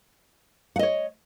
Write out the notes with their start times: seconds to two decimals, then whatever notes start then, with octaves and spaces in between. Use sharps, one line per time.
0.76 F#5
0.79 D#5
0.83 C#5